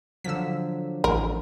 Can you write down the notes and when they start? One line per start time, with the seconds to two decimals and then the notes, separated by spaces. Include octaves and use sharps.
0.24 D3 F3 F#3 E6 B6
1.04 A1 A#4